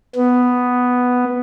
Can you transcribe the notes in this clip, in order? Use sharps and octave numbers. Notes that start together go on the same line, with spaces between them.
B3